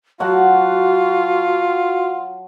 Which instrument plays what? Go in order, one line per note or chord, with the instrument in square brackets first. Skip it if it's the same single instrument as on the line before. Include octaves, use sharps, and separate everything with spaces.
[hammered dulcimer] F#3 F#5 A5 [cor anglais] F4 [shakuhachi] F#4